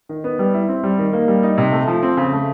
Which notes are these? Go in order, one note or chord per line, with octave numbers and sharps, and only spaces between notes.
D#3
B3
G3
E4
C4
G3
D#3
A#3
G3
D#4
C3
A3
F3
C4
C#3
A3